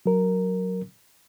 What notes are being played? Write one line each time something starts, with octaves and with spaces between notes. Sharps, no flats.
F#3 A#4